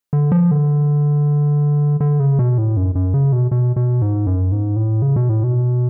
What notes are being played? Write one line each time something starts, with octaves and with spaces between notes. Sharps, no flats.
D3
F3
D3
D3
C#3
B2
A2
F#2
F#2
C#3
B2
B2
B2
G#2
F#2
G#2
A2
C#3
B2
A2
B2